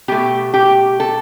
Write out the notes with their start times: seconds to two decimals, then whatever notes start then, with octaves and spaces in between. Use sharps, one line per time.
0.08 B2 A3 G4
0.54 G4
1.00 A4